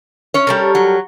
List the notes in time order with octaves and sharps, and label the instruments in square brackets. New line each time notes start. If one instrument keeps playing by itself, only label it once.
[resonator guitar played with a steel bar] C#4 C#5
[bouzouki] G3 A4 A#4
[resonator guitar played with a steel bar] F#3